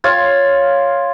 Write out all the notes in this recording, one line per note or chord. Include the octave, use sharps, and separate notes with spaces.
F4 C#5 F5